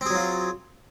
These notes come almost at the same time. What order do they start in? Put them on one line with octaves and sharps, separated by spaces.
C4 G#4 F#3 F4